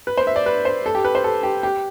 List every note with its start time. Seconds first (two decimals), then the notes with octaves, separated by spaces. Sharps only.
0.07 B4
0.17 C5
0.27 E5
0.36 D5
0.46 B4
0.65 C5
0.86 A4
0.95 G4
1.05 B4
1.15 C5
1.24 A4
1.43 G4
1.63 G4